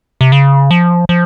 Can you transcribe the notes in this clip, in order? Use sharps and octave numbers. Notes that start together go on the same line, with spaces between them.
C3
C#3
F3
F3